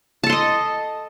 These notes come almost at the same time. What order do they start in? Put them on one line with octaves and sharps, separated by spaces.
A5 A4 C6 D#5